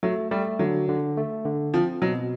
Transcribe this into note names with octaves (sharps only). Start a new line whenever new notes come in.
F#3 A3
G3 A3
D3 F#3
D3
A3
D3
F3 C4
B2 F#3